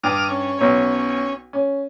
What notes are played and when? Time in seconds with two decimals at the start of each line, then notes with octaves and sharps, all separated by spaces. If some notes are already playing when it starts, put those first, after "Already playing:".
0.03 G2 D6 D#6 F6
0.29 C#4
0.59 B1 C#5
1.53 C#4